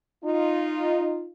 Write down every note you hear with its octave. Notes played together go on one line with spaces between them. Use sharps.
D#4 F4